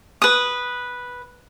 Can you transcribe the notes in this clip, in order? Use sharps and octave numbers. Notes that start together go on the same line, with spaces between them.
B4 D#6